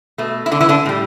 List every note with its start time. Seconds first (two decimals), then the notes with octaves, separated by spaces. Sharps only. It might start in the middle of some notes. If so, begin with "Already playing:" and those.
0.18 B2 A3
0.46 E4
0.52 D3 D4
0.61 E3 E4
0.69 D3 D4
0.86 A2 G3